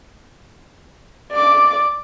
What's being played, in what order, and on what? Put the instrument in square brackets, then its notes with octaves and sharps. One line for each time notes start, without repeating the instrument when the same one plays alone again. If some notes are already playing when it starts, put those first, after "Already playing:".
[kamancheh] D5 D6